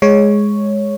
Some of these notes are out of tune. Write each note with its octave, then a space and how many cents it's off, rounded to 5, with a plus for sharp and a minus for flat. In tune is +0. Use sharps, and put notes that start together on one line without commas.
G#3 +0 C#5 +0